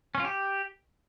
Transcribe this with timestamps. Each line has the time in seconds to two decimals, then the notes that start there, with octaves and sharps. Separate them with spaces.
0.15 C#4
0.20 F4
0.25 G4